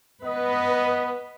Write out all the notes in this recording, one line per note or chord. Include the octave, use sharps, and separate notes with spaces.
B3 B4 D#5